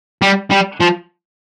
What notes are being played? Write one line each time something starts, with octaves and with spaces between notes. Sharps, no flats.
G3
G3
F3